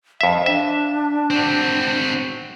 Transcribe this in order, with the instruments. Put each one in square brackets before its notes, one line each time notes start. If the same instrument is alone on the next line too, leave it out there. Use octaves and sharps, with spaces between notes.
[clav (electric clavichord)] F2 E5 [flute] F5
[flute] D4 [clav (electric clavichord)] E5
[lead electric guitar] C4 F#4